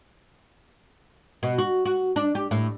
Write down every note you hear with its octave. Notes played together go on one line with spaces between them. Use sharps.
B2
F#4
F#4
D4
G4
A2